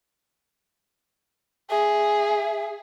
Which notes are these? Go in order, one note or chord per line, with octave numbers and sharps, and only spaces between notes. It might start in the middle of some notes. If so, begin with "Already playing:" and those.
G#4 E5